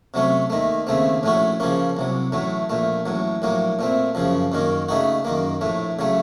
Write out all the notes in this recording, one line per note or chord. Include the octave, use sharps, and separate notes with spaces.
C3 F#3 A3 C#4
D#2 D#3 A3
D#2 C#3 A3 C4
A#1 A2 A3 C#4 F#4
C#3 F3 A#3 C#4
C2 C3 F#3
A1 A2 F#3 A3
A#1 A#2 A3
A1 A2 F#3
A#1 A2 F#3 A#3
A#2 A3 C4
F#2 C#3 F3
F#2 D#3 A#3 C#4
C#3 A3 D#4 F#4
F#2 D#3 A#3
A#1 A2 A3
C#3 F#3 A3